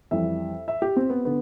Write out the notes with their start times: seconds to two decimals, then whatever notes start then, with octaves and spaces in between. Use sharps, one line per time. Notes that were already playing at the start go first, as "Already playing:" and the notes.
0.11 F2 E3 G3 E5
0.68 E5
0.82 G4
0.97 C4
1.10 B3
1.25 D3 B3